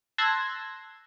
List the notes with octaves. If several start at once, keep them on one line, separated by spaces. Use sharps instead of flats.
A5 C6 E6 F#6 G#6 A#6